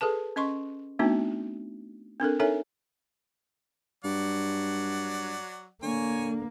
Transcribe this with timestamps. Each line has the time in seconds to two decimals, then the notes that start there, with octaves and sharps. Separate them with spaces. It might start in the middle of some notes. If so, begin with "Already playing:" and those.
0.01 G#4 A4 B4 A5
0.36 C#4 D#5 C6 C#6
0.99 A3 B3 C4 D4 D#4 F#4
2.20 C4 D4 A4 A#4
2.40 D#4 A4 A#4 C#5 E5 G#5
4.04 G2 F#3 D5 F#5
5.83 D3 A#3 C#5 G#5